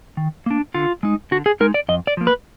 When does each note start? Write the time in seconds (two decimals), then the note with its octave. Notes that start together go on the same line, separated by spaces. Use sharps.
0.17 D#3
0.46 A#3 D4
0.74 D3 F4
1.03 G#3 D#4
1.31 D3 F#4
1.46 G#4
1.60 G#3 D#4 A#4
1.74 D5
1.88 F2 D#5
2.07 D5
2.17 F3 A#3
2.27 B4